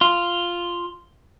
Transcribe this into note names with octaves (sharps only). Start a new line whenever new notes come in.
F4